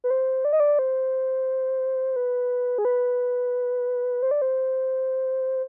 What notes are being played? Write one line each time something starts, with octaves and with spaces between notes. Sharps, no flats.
B4
C5
D5
D#5
D5
C5
B4
G#4
B4
C5
D5
C5